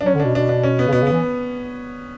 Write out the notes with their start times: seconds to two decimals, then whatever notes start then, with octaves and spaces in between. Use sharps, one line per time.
0.01 D4
0.05 F#3 C#4
0.15 D3
0.20 B2 D4
0.35 B2 D4
0.49 D4
0.63 C#4
0.79 B3
0.87 C#3
0.93 B2 B3
1.02 C#3
1.07 B3
1.12 E3